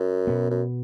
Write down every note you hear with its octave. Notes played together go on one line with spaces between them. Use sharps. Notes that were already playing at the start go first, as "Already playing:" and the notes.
Already playing: F#2
B2 B3
F#2